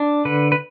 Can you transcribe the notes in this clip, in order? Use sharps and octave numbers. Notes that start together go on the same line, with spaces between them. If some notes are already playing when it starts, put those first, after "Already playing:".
Already playing: D4
D3 B4
B4